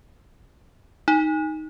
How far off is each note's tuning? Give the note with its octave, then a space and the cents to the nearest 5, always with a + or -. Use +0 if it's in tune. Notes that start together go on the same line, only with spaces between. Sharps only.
D#4 +5